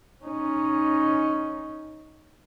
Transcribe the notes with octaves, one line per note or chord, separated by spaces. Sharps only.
C#4 D#4